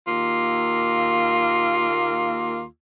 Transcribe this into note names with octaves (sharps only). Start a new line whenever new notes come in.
D#2 A#3 F4